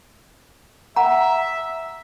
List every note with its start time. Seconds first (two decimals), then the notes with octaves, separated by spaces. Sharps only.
0.96 E5 F#5 A#5